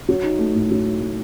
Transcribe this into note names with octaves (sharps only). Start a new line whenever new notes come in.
F#3
D#4
A3
A2
F#3
D#4
A3